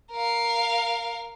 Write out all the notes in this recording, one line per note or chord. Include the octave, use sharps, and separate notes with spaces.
A#4 F5